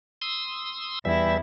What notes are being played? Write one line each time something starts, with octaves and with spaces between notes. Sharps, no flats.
C6 D#6 E6
E2 E3 G3 E4 E5